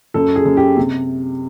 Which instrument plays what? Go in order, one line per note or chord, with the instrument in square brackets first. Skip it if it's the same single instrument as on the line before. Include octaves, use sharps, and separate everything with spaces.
[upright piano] F#2 A4
G#4
F#2
G4
C3